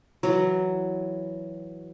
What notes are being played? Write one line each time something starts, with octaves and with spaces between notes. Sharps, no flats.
E3 F#3